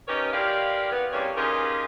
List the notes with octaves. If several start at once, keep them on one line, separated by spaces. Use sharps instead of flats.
B3 C#4 D#4 G4 A#4 C#5
E4 F4 G4 A#4 D5 F5
B3
E2 C3 G3 A#3 C#4 C#5
D#3 C#4 F4 G4 G#4 A#4